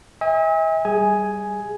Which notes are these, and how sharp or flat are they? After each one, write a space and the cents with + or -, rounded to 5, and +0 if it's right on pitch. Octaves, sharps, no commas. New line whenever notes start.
E5 -45 G#5 -40
G3 +0 G#4 +0 G#5 +5